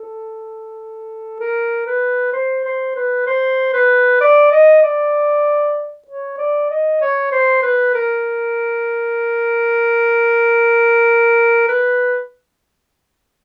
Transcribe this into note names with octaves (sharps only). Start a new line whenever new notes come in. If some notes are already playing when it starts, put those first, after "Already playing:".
Already playing: A4
A#4
B4
C5
C5
B4
C5
B4
D5
D#5
D5
C#5
D5
D#5
C#5
C5
B4
A#4
B4